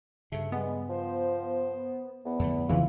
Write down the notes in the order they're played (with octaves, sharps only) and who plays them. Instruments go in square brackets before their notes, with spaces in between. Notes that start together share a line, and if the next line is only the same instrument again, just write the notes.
[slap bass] G2 C#3 [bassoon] A3
[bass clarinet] G3 [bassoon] G#3 [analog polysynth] B3
[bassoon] F3 [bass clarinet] C5
[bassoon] E2 [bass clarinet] B3
[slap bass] F2 D3 A3
[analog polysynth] G#1 C#3 E3 [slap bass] F2 F3 [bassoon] F4